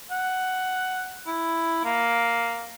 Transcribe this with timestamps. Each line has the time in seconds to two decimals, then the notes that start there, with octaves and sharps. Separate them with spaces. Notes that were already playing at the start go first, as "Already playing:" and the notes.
0.11 F#5
1.27 E4
1.84 A#3